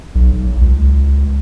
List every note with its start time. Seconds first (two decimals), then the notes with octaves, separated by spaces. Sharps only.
0.15 B1
0.32 B1
0.61 C#2